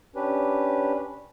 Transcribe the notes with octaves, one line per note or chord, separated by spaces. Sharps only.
C#4 D4 G4 B4